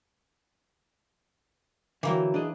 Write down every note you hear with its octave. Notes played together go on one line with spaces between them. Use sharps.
D3 E3 F#3 A#3 G5
D4 G#4 D#5